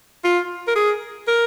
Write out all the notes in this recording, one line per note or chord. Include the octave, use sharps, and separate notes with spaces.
F4
A#4
G#4
A#4